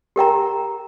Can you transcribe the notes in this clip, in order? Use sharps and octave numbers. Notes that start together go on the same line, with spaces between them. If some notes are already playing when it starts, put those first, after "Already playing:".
G4 A#4 G5 A#5